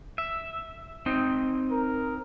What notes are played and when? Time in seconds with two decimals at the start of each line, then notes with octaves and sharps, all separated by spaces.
0.18 E5
1.06 C4 D#4
1.71 A#4